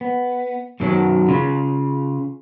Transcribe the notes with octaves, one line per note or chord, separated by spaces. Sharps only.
B3
F#2 B2 D#3 F#3
C#3 F4